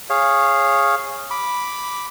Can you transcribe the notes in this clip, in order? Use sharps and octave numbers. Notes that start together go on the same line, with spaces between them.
G#4 C#5 F5
B5 D6